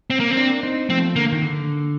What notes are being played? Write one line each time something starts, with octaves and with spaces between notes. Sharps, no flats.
C4
A#3
C4
A#3 D4
C4 D#4
F3 A3 C4
D3 A#3
D#3
D3